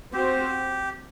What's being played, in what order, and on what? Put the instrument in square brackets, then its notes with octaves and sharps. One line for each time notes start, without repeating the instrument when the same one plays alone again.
[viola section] C4 F#4 C5 [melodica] G4